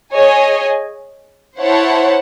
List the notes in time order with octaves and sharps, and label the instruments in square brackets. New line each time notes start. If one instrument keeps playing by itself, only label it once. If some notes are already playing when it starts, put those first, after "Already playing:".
[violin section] G#4 D#5 G#5 [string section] C#5
[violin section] E4 C5 F#5 A5 [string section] C#5